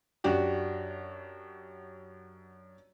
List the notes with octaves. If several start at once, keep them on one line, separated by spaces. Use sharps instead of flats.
F#2 D4 F#4 G4